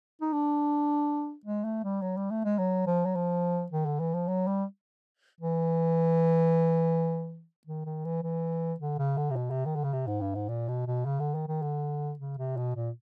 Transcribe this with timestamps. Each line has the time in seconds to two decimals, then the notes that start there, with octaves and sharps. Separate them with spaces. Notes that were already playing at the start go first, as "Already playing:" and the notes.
0.21 D#4
0.33 D4
1.46 G#3
1.64 A3
1.84 G3
2.02 F#3
2.17 G3
2.31 A3
2.44 G#3
2.58 F#3
2.87 F3
3.05 F#3
3.15 F3
3.72 D#3
3.86 D3
4.00 E3
4.14 F3
4.28 F#3
4.47 G3
5.41 E3
7.67 D#3
7.86 D#3
8.05 E3
8.23 E3
8.80 D3
8.98 C#3
9.17 D3
9.30 C3
9.36 B2
9.50 C3
9.65 D#3
9.75 D3
9.84 C#3
9.93 C3
10.07 G#2
10.21 G2
10.35 G#2
10.49 A#2
10.68 B2
10.87 B2
11.05 C#3
11.20 D3
11.34 D#3
11.48 D#3
11.62 D3
12.19 C#3
12.38 C3
12.57 B2
12.75 A#2